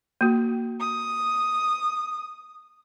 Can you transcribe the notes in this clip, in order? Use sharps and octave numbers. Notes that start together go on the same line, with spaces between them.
A#3 F#4
D#6